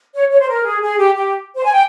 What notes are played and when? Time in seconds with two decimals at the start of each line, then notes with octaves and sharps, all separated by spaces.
0.14 C#5
0.31 C#5
0.40 C5
0.48 A#4
0.64 G#4
0.81 G#4
0.97 G4
1.14 G4
1.56 C5
1.64 G#5
1.73 G5